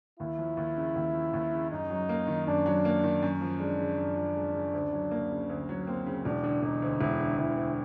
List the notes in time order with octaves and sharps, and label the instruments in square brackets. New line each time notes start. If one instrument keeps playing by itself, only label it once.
[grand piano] D#2 [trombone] E4
[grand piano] F3
D#2
C#3
D#2
F3
D#2
C#3
[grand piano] F#2 [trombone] D#4
[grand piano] F#3
A#3
D#3
[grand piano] F#2 [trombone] D4
[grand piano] F#3
A#3
D#3
F#2
F3
[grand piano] G#3 [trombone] D4
[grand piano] C#3
F#2
F3
G#3
C#3
D2
F#3
A#3
C#3
D2
F#3
[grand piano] A#3 [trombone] C4
[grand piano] C#3
[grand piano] E1 [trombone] D4
[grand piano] D3
[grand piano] E1 [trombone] D#4
[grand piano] D2
[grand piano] E1 [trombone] E4
[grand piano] D3
[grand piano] E1 [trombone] E4
[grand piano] D2